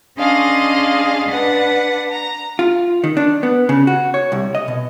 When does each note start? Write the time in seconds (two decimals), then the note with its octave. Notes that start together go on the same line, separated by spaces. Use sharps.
0.19 C#4 D4 G#4 D#5 F5 C6
1.29 D4 B4 F#5
2.12 A#5
2.59 F4
3.04 D#3
3.17 D4
3.43 B3
3.69 C#3
3.87 F#4
4.14 C#5
4.32 C2
4.55 D#5
4.68 B2